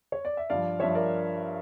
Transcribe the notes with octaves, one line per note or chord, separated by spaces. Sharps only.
C#5
D5
E5
G2 F3 D5 F5
G2 F3 C#5 E5
A#4 D5